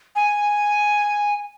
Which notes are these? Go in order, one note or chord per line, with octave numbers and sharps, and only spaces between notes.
G#5